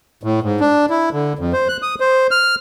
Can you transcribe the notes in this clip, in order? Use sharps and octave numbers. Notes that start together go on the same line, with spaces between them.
A2
G#2
D4
E4
D3
F2
C5
F#6
D#6
C5
F6